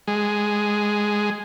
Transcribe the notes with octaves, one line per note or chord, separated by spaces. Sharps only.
G#3